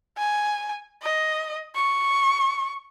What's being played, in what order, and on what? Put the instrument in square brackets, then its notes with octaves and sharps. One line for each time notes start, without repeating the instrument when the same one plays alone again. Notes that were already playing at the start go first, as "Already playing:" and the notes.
[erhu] G#5
D#5
C#6